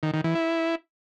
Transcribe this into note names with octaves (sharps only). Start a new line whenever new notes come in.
D#3
D#3
E3
E4